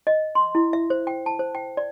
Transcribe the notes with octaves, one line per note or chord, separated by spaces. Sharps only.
D#5
C6
E4
E5
C5
G5
A5
C5
G5
D5